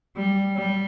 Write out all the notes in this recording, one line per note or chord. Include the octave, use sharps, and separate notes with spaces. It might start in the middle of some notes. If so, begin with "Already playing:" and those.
G3
G3